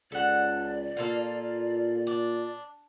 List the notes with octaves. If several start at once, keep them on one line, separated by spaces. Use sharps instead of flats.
C#2 A4 D5 F#5
A#2 A#3 F4 A4
D4